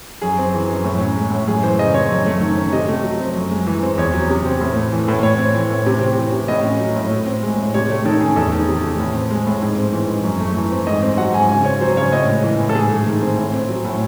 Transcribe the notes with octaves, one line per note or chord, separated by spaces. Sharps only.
F#2 G#4
C4
E3
F#2
A2
C#4
G#3
A2
F#2 G#4
E3 C5
C#3 D#5
C4 C#5
F#2
A3
D#3
C#4
C3 D#5
A3
F#3
C4
F#2
G#3
E3
C4
E2 C#5
F#3
C3
C4
A2
A3
E3
A2
A2 C#5
C4
E3
A2
C3
C4
E3
C3
A2 D#5
C#4
F#3
A2
A2
C4
G#3
A2
C3 C#5
A3 C#5
D#3 A4
C#4 G#4
E2 A4
D#3
C3
A3
A2
C4
G#3
A2
G#2
C4
E3
G#2
F#2
A3
E3
C4
G#2 D#5
C4
F#3 F#5
G#2 G#5
C#3 G#5
C4 C#5
F#3 C5
C#3 C#5
A2 D#5
G#3
E3
A2
A4
G#2 G#4
A3
D#3
C4
A2
C4
F#3
A2